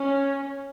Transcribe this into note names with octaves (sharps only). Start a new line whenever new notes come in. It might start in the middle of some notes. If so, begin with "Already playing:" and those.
Already playing: C#4